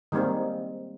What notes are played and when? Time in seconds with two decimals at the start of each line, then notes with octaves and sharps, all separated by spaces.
0.12 D#3 G3 G#3 A#3 C4